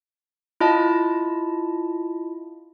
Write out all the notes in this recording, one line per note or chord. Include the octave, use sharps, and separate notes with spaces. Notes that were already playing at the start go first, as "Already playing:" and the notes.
E4 F4 D#5 A5